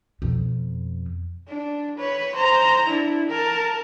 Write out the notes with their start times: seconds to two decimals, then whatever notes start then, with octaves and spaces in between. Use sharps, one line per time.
0.22 F2 B2
1.48 D4
1.98 B4 C#5
2.35 C5 A#5
2.87 D4 E4
3.29 A#4 A5